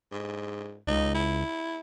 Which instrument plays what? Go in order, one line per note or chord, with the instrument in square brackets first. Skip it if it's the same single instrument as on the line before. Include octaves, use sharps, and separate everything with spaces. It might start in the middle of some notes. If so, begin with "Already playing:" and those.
[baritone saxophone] G#2
[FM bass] C#2 [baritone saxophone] D#4
[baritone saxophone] E4